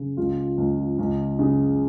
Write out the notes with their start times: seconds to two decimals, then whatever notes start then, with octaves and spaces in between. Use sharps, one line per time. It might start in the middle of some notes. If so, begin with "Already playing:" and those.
Already playing: C#3
0.17 C#2 F4
0.58 C#2
0.99 C#2
1.39 C#3